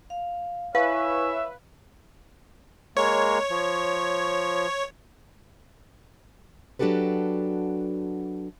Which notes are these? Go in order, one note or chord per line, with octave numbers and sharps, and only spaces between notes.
F5
E4 B4 C#5 E5 F5 G#5 C#6
G#3 A#3 C#5
F3
F#3 D4 F#4 G4 A4 B4